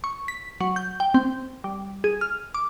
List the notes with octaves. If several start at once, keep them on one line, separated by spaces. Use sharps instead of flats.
C#6
B6
F#3
G6
G5
C4
G3
G#4
F6
D6